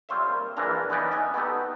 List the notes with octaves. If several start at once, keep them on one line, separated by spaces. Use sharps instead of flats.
G3 C4 F4 C5 C#5 E5
A#3
A#1 E3 A#3 D4 A#5
E3 B3 C#4 D#4 B4 D5
D#5 E5 F#5 G#5
B3 D#4 F#4 G4 A4